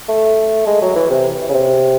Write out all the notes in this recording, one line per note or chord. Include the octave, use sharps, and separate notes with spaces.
A3
G#3
F#3
E3
C3
C#3
C3